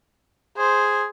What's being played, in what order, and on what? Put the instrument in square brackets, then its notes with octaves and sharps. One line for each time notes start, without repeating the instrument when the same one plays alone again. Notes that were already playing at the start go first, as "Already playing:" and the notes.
[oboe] G#4 [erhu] C5